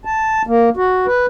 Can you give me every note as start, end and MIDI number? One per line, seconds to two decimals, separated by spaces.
0.05 0.42 81
0.47 0.70 58
0.77 1.06 66
1.06 1.26 71